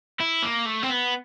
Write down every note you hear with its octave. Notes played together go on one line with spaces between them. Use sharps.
E4
A#3
A3
C4
B3